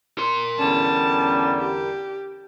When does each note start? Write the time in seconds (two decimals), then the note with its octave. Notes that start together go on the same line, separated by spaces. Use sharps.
0.18 A#4 C6
0.59 E2 D3 G3 C#4 A5
1.60 G4